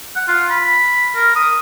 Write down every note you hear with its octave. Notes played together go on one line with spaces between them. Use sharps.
F#5
F4
B5
A#4
D#6